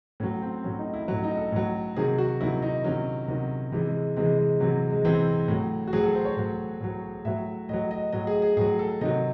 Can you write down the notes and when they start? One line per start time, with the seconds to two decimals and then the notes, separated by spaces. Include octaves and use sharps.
0.20 A2 C#4
0.23 F#3
0.42 C4
0.64 A2 F#3 C#4
0.79 D#4
0.94 E4
1.08 F#3 E4
1.12 A2 C#4
1.23 D#4
1.37 A4
1.52 A2 F#3
1.96 C3 D#3 F#3 G#4
2.18 F#4
2.41 C3 D#3 F#3 E4
2.62 D#4
2.84 C3 D#3 F#3 C#4
3.28 C3 D#3 F#3
3.72 C3 E3 G#3
3.88 G#3
4.16 C3 E3 G#3
4.38 G#3
4.60 C3 E3 F#3
4.90 G#3
5.05 C3 E3 C4
5.48 A2 F#3
5.87 F#4
5.93 A2 F#3 G#4
6.04 A4
6.15 C5
6.25 C#5
6.37 A2 F#3
6.81 A2 F#3
7.25 A2 F#3 E5
7.69 A2 D#5
7.73 F#3
7.91 D#5
8.12 A2 F#3 D#5
8.27 G#4
8.42 G#4
8.57 A2 F#3 G#4
8.79 A4
9.01 C3 D#3 F#3 D#5